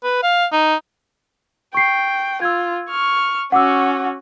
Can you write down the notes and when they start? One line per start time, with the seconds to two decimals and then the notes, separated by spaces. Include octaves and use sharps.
0.04 B4
0.23 F5
0.52 D#4
1.74 G5 C#6 C7
2.42 F4 E6 G#6
2.90 C#6 F6
3.52 C#4 F#4 F#5 D6 E6